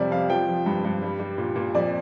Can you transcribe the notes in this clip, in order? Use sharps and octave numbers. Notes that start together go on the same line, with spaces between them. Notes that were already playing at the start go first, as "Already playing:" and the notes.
Already playing: F2 C3 G3 D5
F2 F5
F3 G5
F3
G2
G2
G3
G3
A#2
A#2
F2 D5